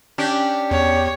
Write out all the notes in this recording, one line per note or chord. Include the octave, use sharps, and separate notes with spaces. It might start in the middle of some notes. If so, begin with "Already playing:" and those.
C#4 D4 G4
E2 C#5